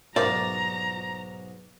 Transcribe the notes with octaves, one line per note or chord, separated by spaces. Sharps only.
B1 G#2 A#4 C5 D5 E5 A#5